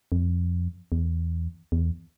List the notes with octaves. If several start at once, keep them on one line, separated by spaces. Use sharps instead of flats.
F2
E2
E2